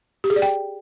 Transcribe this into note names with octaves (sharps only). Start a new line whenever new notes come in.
G4
G#4
D5
G5